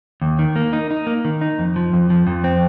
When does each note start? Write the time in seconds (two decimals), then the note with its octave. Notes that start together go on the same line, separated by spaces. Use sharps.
0.22 D#2
0.39 D#3
0.56 A#3
0.73 D#4
0.91 D#4
1.07 A#3
1.25 D#3
1.41 D#4
1.59 F2
1.76 F3
1.93 F2
2.10 F3
2.27 F2
2.44 C4